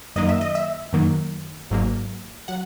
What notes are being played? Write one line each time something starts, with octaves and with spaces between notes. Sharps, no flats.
F#2 D#3 F#3 A#3 D#5
E5
D#5
E5
F#2 D#3 F#3 A#3
G#1 G#2 F#3 A#3
F#3 F#5